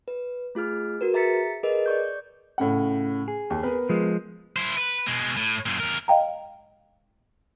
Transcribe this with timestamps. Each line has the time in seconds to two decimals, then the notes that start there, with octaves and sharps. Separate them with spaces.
0.08 B4
0.55 A3 F4 G#4 F6
1.01 F#4 A#4 B4
1.14 G#4 E5 A#5 A6 B6 C#7
1.63 G#4 A#4 B4 D#5
1.86 D5 C#6 G6
2.58 A2 C#3 F#5
3.28 G#4
3.50 D#2
3.63 B3 A#4 B4
3.89 F3 G#3
4.56 E4 C5
4.77 B4
5.06 B2 G#3
5.37 A2
5.66 F#2 A#2
5.80 E2 A#4
6.08 D#5 F5 G5 A#5